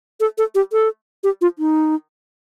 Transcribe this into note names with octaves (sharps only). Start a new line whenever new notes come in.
A4
A4
G4
A4
G4
F4
D#4